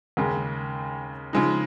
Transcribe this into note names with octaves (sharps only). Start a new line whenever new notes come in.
D#2 C#3 G#3
C#3 F3 G#3 D#4